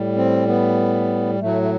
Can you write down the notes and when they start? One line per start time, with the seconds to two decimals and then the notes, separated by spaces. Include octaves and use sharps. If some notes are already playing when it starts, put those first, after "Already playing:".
Already playing: A2 G3
0.17 C4
0.48 B3
1.40 A2 F#3 A3
1.62 A3